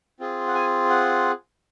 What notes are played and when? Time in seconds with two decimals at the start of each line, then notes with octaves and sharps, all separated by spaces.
0.20 C4 F4 G#4
0.48 F#5
0.55 G#5
0.90 F#5